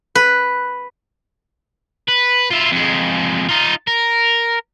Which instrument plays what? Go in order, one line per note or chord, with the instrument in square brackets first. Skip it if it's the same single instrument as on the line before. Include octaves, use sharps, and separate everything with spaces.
[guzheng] B4
[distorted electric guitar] B4
E4 F4
F2 G#3
D#4 F4
A#4